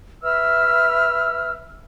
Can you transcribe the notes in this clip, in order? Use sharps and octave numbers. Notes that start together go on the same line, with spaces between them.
B4 E5 E6 F6